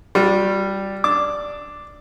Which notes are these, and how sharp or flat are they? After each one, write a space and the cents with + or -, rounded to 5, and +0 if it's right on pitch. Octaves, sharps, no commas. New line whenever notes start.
G3 +0 F#4 -45
D4 +0 D6 +0